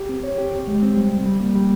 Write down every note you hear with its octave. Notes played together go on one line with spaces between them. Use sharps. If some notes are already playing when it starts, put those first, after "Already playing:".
Already playing: G4
C4
C#5
G4
D#2
G#3
C4
G3
C2
G3
A#3
G3